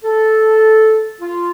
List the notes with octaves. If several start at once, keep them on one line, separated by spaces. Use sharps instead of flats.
A4
F4